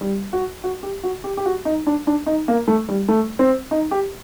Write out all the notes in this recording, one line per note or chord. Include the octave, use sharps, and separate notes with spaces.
G3
F#4
F#4
G4
F#4
G4
G4
F#4
D#4
D4
D4
D#4
A#3
A3
G3
A3
C4
D#4
G4